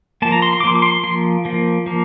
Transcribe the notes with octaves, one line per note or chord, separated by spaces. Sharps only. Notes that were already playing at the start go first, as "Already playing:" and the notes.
F3 A#3 A5
A#5
C6
C6
D6
F3 A#3 C6
D6
C6
F3 A#3 C6
F3 A#3
F3 A#3